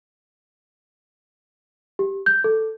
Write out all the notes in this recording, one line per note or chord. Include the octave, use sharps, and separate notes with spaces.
G4
G6
A4